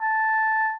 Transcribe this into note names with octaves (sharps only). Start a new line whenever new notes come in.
A5